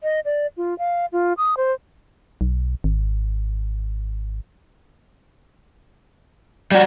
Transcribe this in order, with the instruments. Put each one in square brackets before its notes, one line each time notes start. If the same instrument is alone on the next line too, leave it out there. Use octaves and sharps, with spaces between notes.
[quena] D#5
D5
F4
F5
F4
D#6
C5
[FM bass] B1
G#1
[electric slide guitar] G3 F#4 [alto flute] D5